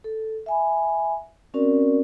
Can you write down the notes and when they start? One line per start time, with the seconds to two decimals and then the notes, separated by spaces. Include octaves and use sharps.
0.04 A4
0.46 E5 G#5 B5
1.54 C4 C#4 F#4 A#4 D5